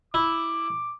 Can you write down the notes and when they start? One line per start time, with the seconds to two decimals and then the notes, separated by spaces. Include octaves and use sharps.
0.14 E4 D6